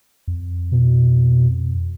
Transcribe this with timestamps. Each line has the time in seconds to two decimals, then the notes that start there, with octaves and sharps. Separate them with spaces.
0.28 F2
0.71 B2